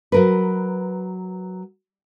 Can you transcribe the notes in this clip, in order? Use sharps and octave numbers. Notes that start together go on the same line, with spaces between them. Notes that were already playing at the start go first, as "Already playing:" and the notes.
F#3 A#4 B4